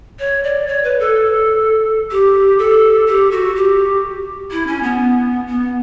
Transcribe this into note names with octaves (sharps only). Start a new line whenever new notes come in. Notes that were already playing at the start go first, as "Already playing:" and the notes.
C#5
D5
C#5
B4
A4
G4
A4
G4
F#4
G4
E4
C#4
B3
B3